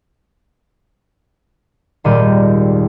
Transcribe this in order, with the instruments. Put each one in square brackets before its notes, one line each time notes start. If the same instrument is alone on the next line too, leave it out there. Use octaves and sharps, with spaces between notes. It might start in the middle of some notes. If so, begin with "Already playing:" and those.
[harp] G#1 D#2 A#2 G3 G4 D#7